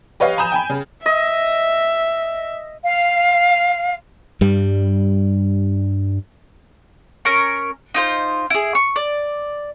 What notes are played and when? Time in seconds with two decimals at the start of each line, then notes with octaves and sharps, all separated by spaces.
0.20 G4 B4 C#5 D#5 F5
0.38 G#5 A#5 B5 D#6 G6 E7
0.52 G5 G#5 B5
0.70 C#3
1.06 D#5 E5
2.83 F5
4.41 G2 G3
7.25 C#4 A#4 C#6
7.94 D#4 F4 C5
8.50 E4 G#4
8.75 C#6
8.96 D5